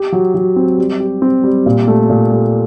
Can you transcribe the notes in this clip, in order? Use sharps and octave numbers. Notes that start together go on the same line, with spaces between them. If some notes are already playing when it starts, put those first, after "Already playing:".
Already playing: G4
F#3
F#3
C4
G3
G4
C4
G3
A#2
A3
A#2
A3